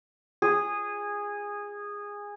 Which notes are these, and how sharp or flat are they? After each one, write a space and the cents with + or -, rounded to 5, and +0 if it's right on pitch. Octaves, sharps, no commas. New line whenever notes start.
G#4 -15